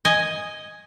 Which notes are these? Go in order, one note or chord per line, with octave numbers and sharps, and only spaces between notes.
D#5 G#5